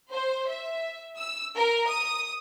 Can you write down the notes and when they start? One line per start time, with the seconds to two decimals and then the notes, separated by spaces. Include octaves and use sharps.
0.11 C5
0.48 E5
1.17 E6
1.57 A#4
1.88 D#6